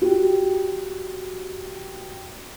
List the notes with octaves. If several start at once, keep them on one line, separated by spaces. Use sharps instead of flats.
F#4 G4